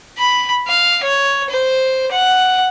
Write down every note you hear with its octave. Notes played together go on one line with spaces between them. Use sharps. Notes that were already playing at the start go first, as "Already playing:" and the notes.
B5
F5
C#5
C5
F#5